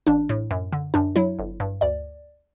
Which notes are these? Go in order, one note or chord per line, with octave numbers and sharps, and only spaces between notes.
A1 D4
A2
F#2
D3
F#2 D4
F#3 E4
G1
G2
D2 D5